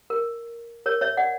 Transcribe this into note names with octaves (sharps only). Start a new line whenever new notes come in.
A#4
A#4 C#5
C#5 E5
D5 F#5